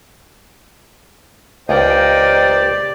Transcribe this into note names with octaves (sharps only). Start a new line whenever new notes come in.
C#2 G4 A#4 C5 D5 D#5 G5